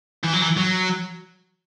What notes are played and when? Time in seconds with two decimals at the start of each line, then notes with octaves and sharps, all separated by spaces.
0.23 E3
0.33 F#3
0.42 E3
0.57 F#3